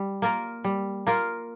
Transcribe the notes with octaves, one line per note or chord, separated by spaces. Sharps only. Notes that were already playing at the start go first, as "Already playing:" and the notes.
Already playing: G3
A#3 F4 A#4
G3
A#3 F4 A#4